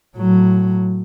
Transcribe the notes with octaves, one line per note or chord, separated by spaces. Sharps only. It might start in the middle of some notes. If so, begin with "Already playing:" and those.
A2 F#3